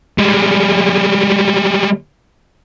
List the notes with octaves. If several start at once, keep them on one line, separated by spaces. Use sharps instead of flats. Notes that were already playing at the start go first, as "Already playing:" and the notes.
G3 G#3